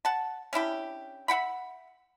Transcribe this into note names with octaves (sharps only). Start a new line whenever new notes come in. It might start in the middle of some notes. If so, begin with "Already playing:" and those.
F#5 A5
C#4 D4 E4 G4
E5 F#5 G5 B5